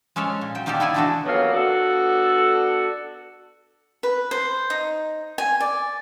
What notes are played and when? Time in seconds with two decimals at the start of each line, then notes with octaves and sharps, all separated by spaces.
0.16 G#3 C#4 A4 C#5
0.41 A#2
0.55 F#3 G5
0.66 D#3 A#3 G4 A4 D5
0.80 B3 E4 A4 D5 G#5
0.94 D3 E3 A3 D4 F#4 A4
1.25 F2 F#3 A#3 B3 F5
1.53 B3 D4 F#4 A4
4.03 B4
4.31 C5
4.70 D#4
5.38 G#5
5.60 D5